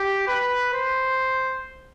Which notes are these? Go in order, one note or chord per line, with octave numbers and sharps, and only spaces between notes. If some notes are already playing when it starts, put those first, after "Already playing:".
Already playing: G4
B4
C5